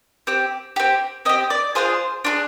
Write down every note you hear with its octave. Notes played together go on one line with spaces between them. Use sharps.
C4 G4
C4 G4
C4 G4 D#5
D5
D4 F4 G#4 C5
D4 F4 G#4